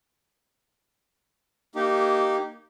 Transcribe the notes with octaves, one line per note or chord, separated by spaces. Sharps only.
A#3 D#4 G4